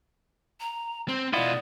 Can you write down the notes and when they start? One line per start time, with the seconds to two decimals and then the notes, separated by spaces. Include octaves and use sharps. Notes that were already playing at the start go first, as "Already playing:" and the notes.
0.60 A#5
1.08 C4 C6
1.33 B2 B3 E4 F4 D5 D#5